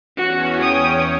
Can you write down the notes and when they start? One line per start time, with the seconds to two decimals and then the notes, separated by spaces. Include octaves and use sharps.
0.17 E2 C#4 F#4 C#5
0.61 G5 D#6